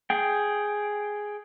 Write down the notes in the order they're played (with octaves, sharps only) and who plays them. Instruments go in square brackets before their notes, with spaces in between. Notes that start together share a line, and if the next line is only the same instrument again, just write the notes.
[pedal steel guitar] G#4 G5